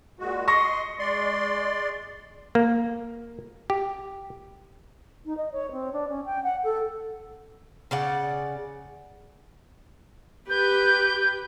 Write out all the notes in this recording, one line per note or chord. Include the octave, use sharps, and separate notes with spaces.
A#2 G#3 F#4
D#5 C6 C#6 A#6
G#3 D5 C6
A#3
G4
D#4
D#5
C#5
C4
D4
C#4
G5
F#5
A4
C#3 D5 F#5
G4 B4 G6